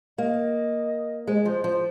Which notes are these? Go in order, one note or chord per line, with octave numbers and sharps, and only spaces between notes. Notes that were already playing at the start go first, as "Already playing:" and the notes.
A#3 D#5
G#3 C5
D#5
F3 C5
F3